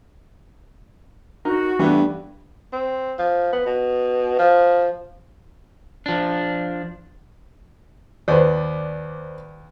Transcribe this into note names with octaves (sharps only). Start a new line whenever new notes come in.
D#4 F#4 A#4
G2 E3 A3 B3
C4
F3
B3
B2
F3
F3 D4
D#2 B4 C5 D5